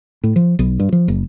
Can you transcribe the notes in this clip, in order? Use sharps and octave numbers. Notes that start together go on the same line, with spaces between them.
A2
F3
B1
G2
F3
F#1